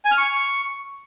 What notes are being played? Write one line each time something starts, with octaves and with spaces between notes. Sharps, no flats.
G#5
F6
C#6